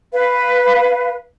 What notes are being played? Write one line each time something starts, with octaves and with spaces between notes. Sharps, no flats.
B4 F5